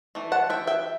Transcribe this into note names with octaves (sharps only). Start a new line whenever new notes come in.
E3 A3
F#5 A5
E5 G5
E5 G5